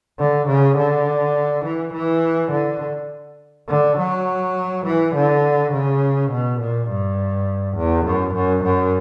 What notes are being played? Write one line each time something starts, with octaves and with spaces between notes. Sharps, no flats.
D3
C#3
D3
E3
E3
D3
D3
F#3
E3
D3
C#3
B2
A#2
G2
E2
F#2
F#2
F#2